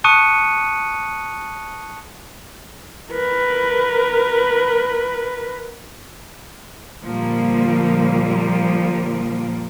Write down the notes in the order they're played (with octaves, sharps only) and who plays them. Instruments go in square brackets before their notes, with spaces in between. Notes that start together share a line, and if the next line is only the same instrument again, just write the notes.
[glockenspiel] A5 C#6 D#6 F#6 C#7 D#7
[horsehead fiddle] A#4 B4
[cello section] A#2 D3 F3 G3 A#3